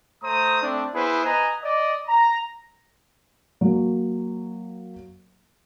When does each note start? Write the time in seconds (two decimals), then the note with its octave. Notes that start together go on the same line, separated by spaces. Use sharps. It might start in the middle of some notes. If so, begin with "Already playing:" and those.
0.23 A3 C5 A#5 D#6
0.62 A3 C4 D4
0.95 B3 E4 G#4 B4 C5
1.25 B4 D#5 G#5 A#5
1.63 D5 D#5
2.07 A#5
3.61 F#3 A#3